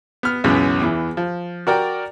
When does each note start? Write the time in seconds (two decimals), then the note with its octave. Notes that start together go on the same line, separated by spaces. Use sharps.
0.23 B3 F6
0.44 C#2 F#2 B2 E3 B3
0.81 E2 E3
1.17 F3
1.67 F#4 A#4 D5 G5